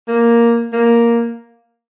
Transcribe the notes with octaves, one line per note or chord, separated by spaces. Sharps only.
A#3
A#3